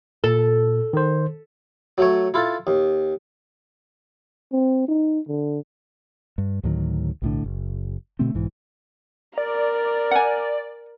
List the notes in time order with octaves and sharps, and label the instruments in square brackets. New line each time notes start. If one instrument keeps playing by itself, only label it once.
[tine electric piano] A#2 [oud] A4
[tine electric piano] D#3 C5
[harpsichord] F#3 A3 C#5
E4 F4 A4
D#2
[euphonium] C4
D#4
D3
[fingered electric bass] G2
D2 A2 D#3 F#3
B1 A2 D3
F#1
B2 D3 A3 C4
B1 G#2 E3
[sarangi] A#4 [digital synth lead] D5
[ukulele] F#5 G#5